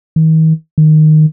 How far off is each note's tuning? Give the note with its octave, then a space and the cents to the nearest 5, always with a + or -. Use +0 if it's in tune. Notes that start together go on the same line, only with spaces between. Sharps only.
D#3 +40
D#3 -10